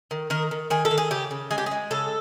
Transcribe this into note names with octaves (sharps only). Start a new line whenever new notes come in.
D#3
D#3 A#4
D#3
D#3 G#4
A4
D#3
G#4
C#3 G4
C#3
G#3 G#4
G4
G#4
G#3
C#3 A4